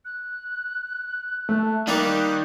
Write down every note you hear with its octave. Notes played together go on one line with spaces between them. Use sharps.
F#6
A3
D#3 G3 A#3 G4 F#6